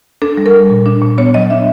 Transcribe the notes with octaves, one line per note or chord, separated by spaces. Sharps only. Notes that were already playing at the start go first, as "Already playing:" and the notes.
D4 A4
G3
A#4
G3
A#2
D4
A#2
B3 C#5
F#3 D#5
D4 E5